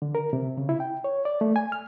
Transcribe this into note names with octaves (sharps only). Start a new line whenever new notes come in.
D3
A#4
C3
C#3
E4
G5
C#5
D5
A3
G#5
F6